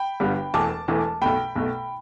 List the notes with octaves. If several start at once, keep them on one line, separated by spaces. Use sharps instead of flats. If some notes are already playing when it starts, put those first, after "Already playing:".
Already playing: G5 B5
G1 G2 G3 B3
E1 E2 E3 A3 A5 D6
E1 E2 E3 A3
B1 B2 A3 G5 B5
B1 B2 A3